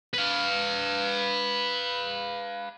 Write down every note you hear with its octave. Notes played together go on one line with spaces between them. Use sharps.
B4 F5